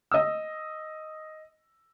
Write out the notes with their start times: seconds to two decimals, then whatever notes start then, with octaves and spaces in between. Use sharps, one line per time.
0.11 D#5 E6